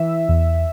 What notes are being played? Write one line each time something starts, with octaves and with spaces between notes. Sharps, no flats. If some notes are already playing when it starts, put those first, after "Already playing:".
Already playing: E3 E5
E2